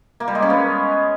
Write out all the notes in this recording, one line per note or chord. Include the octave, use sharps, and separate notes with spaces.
A#3
G3
G#3
C#4
B3